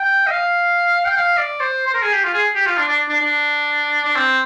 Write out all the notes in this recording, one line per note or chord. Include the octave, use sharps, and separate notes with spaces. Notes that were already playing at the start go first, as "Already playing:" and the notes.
Already playing: G5
D#5
F5
G5
F5
D5
C5
C5
A#4
G#4
G4
F4
G#4
G4
F4
D4
D4
D4
D4
D4
C4